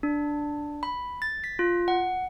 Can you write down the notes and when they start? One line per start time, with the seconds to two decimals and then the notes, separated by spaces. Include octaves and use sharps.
0.03 D4
0.83 B5
1.22 A6
1.44 B6
1.59 F4
1.88 F#5